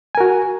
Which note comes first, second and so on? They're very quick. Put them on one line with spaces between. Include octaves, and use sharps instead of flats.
G#5 A#4 F#4